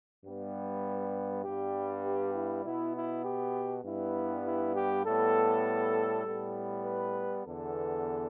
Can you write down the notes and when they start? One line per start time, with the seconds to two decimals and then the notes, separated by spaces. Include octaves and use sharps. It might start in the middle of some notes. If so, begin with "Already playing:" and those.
0.24 G2 G3 B3
1.44 G2 G3 B3 G4
2.04 G4
2.34 E4
2.64 B2 B3 E4
2.95 E4
3.24 G4
3.84 G2 G3 B3 E4
4.44 E4
4.74 G4
5.04 A2 G3 B3 A4
6.26 A2 G3 B3
6.86 B4
7.45 E2 D3 B3 A4